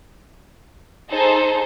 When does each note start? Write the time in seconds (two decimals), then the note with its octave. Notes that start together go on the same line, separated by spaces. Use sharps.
1.09 D#4 G#4 A4 C5